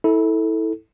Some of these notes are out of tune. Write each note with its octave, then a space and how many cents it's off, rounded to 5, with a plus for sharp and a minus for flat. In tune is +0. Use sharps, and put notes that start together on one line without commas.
E4 -25 A4 +0